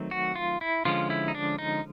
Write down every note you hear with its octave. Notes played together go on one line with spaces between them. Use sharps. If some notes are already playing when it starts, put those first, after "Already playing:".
Already playing: D#3 F#3 A3 C4
F#4
F4
E4
D3 F3 G#3 C#4 F4
E4
D#4
D4
D#4